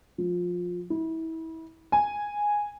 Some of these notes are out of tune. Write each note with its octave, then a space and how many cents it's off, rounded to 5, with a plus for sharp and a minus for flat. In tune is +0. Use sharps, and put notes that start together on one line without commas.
F3 +20
E4 -30
G#5 -5